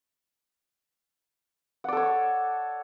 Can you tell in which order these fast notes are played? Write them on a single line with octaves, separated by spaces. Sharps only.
F#5 D5 A4 C#5